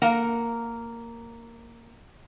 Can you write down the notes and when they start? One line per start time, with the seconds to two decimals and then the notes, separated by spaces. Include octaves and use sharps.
0.02 A#3 A#4 F#5